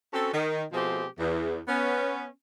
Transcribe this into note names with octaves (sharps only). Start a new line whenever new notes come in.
C4 C#4 F#4 A4
D#3
B2 F3 A3 C4 G4 G#4
E2
B3 C#4